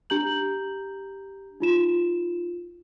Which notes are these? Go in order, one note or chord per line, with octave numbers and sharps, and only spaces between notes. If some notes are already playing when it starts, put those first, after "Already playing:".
D4 G4 A#5 G6 F#7
D#4 F4 E7